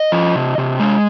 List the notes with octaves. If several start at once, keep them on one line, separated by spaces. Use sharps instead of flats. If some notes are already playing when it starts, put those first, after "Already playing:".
Already playing: D#5
F3
C3
C3
G#3